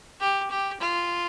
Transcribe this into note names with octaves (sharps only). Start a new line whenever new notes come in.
G4
G4
F4